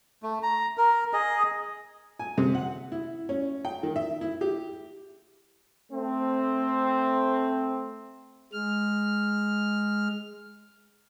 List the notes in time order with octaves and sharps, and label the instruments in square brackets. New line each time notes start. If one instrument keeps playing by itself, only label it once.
[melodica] A3
A#5
A#4
G#4 D#5
[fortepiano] G#5
C3
F#5
E4
C#4
G5
D#3
E5
E4
G4
[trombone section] A3 C4
[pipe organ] G#3 F6